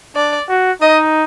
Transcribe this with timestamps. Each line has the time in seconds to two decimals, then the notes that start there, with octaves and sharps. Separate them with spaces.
0.15 D4 D5
0.49 F#4
0.81 D#4 D#5